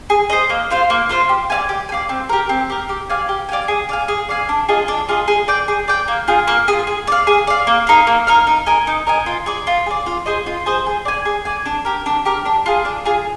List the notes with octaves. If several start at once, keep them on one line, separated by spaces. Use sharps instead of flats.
G#4
C5 D#5
A#3
F4 C5 F5
A#3
F4 C5 F5
G4
D5 F5 G#5
G4
G#5
D5 F5
C4
G4 A#4
C4
G4 A#4
G4
D5 F5 G#5
G4
D5 F5 G#5
G#4
D5 F5 G#5
G#4
D5 F5 G#5
D4
F4 G#4 D#5
D4
F4 G#4 D#5
G#4
D5 G5
G#4
D5 G5
A#3
F4 G#4
A#3
G#4
F4
G#4
D5 F5
G#4
D5 F5
A#3
D#4 A#4 F5
A#3
D#4 A#4 F5
D#4
A#4 D#5 G#5
D#4
A#4 D#5 G#5
F4
G#4 D5
F4
G#4 D5
F4
G#4 C5 D#5
F4
G#4 C5 D#5
G#4
D5 G#5
G#4
D5 G#5
D4
G4 A#4
D4
G4 A#4
D4
F4 G#4
D4
F4 G#4